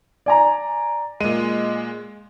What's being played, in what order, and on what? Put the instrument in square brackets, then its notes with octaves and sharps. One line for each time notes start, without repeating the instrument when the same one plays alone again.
[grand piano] D5 G#5 A#5
[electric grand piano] A#2 G#3 [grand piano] D#7